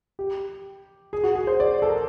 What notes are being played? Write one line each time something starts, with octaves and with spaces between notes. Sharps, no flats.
G4
G#4
F#4
G#4
C5
D5
A4
A#4